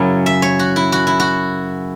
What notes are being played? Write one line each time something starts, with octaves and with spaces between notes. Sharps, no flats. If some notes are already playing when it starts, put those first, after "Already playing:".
Already playing: F#2 C#3 F#3 C#4 E4
E5
C#5
F#4
E4
F#4
E4
F#4